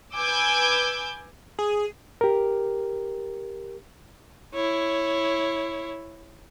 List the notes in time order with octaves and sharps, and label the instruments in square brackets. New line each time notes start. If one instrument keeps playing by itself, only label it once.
[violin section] B4 G#5 D6 E6 G6
[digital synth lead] G#4
[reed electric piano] G4 A#4
[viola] E4 C#5